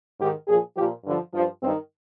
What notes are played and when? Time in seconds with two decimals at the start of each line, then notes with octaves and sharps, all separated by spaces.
0.18 G#2 D#3 G4
0.47 A#2 F3 G#4
0.75 A#2 F3 G4
1.04 G2 D3 F3
1.33 G2 F3
1.62 G2 C4
1.66 D#3